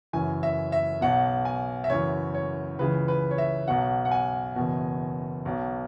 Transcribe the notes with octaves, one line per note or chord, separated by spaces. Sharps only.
F#1 F#2 E3 G#5
E5
E5
B1 B2 F#5
G#5
E5
F#1 F#2 E3 C#5
C#5
C#2 C#3 E3 B4
B4
C#5
E5
B1 B2 F#5
F#5
G#5
F#1 E2 B2
B1 B2